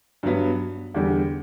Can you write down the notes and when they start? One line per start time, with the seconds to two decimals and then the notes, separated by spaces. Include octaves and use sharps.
0.23 G2 F#3 B3
0.94 E2 D3 G3